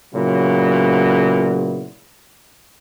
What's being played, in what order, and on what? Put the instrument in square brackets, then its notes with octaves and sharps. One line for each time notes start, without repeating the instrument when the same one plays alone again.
[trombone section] A#2 C#3 F#3 B3 E4